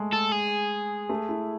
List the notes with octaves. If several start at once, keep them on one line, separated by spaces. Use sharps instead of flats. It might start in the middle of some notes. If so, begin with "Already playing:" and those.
Already playing: G#3 A3
A4
G#4
A3
E4